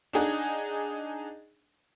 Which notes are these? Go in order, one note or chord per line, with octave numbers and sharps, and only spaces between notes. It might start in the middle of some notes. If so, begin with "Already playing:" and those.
D4 D#4 G#4 D#5 F#5